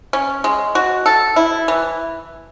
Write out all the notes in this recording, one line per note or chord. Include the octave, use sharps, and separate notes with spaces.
C#4
G#3
F#4
A4
E4
E3